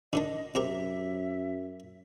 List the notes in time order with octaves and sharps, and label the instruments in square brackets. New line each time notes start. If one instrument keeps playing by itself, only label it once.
[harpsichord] D3 D#3 D4 [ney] D#5
[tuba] F#2 [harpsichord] C3 G4 A#4 [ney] E5